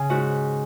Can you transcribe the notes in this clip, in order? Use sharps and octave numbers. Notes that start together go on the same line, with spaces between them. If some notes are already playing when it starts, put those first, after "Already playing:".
Already playing: C#3 G#4
G#2 F#4